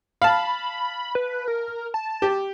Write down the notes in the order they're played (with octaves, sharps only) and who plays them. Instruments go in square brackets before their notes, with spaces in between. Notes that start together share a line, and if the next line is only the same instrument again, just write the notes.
[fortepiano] F5 A5 [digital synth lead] B5
[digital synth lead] B4
A#4
A5
[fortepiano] G4